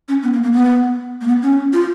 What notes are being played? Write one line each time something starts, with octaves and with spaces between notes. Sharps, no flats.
C#4
B3
A#3
A#3
B3
A#3
B3
C#4
F4